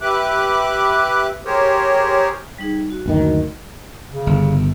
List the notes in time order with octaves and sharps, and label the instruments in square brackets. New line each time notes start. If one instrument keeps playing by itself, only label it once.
[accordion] G4 B4 E5 D6 F#6
G4 G#4 A#4 C5 C#5
[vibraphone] G3 D#4 G#4
F#4
[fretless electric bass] F#1 D2 D#3
[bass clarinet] C#3
[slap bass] G1